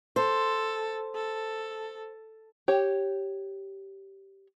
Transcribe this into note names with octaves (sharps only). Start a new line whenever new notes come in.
A4 C5
A4
G4 C#5